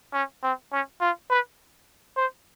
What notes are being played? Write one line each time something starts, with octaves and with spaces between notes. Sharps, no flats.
C#4
C4
C#4
F4
B4
C5